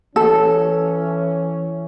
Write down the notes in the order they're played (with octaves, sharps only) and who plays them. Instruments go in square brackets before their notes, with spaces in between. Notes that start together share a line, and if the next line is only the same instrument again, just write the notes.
[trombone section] E3 C#4 [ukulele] A4